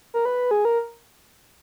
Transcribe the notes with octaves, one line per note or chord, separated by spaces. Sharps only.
A#4
B4
G#4
A#4